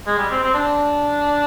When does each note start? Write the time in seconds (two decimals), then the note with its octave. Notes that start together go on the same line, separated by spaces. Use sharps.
0.06 G#3
0.18 G3
0.30 C4
0.43 C4
0.54 D4